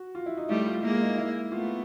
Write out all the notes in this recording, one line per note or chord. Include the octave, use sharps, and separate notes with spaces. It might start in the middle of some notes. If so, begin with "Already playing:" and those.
Already playing: F#4
F4
E4
D#4
G3 A3 E4
F4
G#3 A#3 E4
D#4
E4
A3 B3 F4